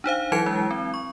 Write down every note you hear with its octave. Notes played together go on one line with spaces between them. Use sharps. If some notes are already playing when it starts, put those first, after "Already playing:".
D4 D#4 C5 F5
E3 F#3 E4 G#6 C#7 D7
G#3 D4 E4
C4
C#6